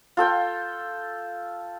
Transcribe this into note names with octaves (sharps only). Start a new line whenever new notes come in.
F4 A4 G5